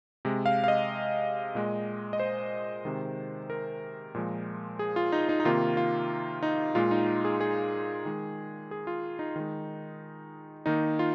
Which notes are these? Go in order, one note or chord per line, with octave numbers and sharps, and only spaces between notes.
C3 G#3
F5
F5
D#5
A#2 G#3
D#5
C5
C3 D#3 G#3
A#4
A#2 F3 G#3
G#4
F4
D#4
D#4
D#4
C3 D#3 A#3 F4
F4
D#4
A#2 G#3 F4
D#4
G#4
G#4
D#3 G#3
G#4
F4
D#4
D#3 G#3
D#3 A#3 D#4
F4